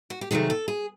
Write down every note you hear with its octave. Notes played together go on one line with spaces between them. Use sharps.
F#4
G4
C3 D#3 F#3 A3 G#4
A4
G#4